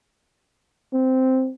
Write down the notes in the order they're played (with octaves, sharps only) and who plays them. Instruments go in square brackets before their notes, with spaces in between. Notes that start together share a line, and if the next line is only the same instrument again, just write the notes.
[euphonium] C4